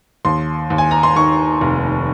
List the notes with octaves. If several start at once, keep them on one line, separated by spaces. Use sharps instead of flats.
D#2 C6
D#2
G#5
A#5
C6
D#3 C#6
F1